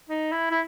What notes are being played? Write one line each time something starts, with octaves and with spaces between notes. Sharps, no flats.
D#4
E4
E4